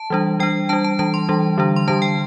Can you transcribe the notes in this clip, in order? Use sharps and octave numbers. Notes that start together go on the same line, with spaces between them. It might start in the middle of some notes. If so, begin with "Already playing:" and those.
Already playing: A5
E3 G3 D4
G3 D4 G5
G3 D4 A5
A5
E3 G3 D4 A5
C6
E3 G3 D4
D3 G3 D4
C6
D3 G3 D4 A5
G5